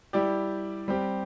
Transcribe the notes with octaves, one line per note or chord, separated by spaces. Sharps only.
G3 E4 G4 D5
G3 C4 G4